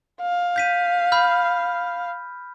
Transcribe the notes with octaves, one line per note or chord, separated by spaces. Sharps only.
F5
G6 B6 D#7
B5 F6 G6